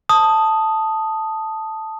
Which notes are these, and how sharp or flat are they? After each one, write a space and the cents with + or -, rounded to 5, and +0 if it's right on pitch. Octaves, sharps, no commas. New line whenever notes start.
A5 +0 D#6 +0